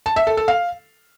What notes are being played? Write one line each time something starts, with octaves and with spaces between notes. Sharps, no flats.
A5
E5
A4
A4
F5